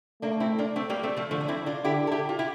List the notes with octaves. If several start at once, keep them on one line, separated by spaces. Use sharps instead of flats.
A3 A#3 D4
C4 E4
A#3 D4
A3 C4
G3 A#3
A3 C4
F3 A3
D3 F3 A3
D4
C4 E4
D4 F4
D3 E4 G4
A4
E4 G4
F4
E4 G4